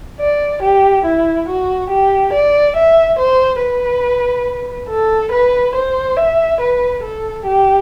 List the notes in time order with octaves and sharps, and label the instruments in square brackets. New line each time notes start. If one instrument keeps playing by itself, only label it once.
[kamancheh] D5
G4
E4
F#4
G4
D5
E5
C5
B4
A4
B4
C5
E5
B4
A4
G4